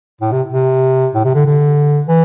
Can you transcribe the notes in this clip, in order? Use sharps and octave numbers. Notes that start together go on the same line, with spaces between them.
A2
C3
C3
A2
C3
D3
D3
E3